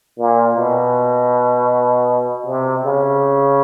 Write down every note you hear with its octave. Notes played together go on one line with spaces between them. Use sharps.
A#2
B2
C3
C#3